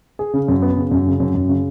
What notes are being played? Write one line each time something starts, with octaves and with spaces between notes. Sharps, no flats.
G#4
C#3
F#2
B3
C#3
F#2
C#3
F#2
F#2
C#3